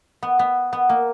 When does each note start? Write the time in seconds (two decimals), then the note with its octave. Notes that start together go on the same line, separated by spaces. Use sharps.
0.22 B3
0.39 B3
0.73 B3
0.89 A#3